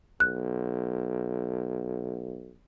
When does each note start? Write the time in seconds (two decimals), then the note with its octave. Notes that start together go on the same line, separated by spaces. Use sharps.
0.20 B1 F#6